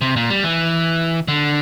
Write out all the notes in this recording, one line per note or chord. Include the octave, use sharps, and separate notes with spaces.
C3
A#2
G3
E3
D3